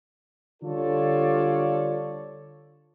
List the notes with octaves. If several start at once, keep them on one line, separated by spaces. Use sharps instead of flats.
D3 G3 F4 A4 C#5 D5